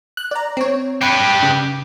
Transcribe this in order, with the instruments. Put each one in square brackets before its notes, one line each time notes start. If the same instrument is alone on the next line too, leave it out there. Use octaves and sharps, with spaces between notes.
[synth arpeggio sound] F#6
D5 A#5
C4 C#5
[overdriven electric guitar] G4 B4 [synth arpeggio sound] C7 C#7
[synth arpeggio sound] C#3